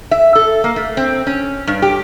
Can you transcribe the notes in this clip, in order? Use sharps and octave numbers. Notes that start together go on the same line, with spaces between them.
E5
A4
A#3
A3
C4
C#4
G2
G4